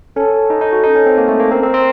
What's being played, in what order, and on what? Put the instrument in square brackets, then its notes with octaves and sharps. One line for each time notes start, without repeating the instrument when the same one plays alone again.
[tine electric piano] C#4 [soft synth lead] A4
[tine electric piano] D#4
D#4
F#4
D#4
C#4
C4
A#3
A3
A#3
[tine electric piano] C4 [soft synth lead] A#4
[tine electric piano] C4
C4